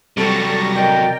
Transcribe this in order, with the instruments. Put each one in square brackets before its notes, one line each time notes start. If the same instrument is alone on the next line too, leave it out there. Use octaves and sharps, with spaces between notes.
[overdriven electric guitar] C3 F#3 [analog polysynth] G3 C#6 A#6 [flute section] A4
[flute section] A#4 D5 D#5 [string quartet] G5